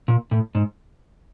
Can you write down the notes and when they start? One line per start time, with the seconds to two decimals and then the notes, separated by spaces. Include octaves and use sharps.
0.08 A#2
0.31 A2
0.55 G#2